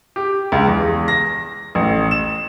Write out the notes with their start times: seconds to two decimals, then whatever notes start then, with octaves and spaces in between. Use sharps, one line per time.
0.16 G4
0.52 C#2
0.67 E2
1.08 A#6
1.75 A1
2.11 E7